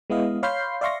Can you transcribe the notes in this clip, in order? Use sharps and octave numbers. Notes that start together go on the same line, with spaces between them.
G#3 B3 E4 D#5 F5
C#5 F5 B5 C6 G6 C7
D5 E5 F5 C6 C#6 A#6